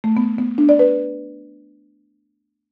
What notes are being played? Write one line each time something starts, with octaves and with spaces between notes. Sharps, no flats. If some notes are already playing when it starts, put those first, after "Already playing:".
A3
B3
B3
D4
D5
B4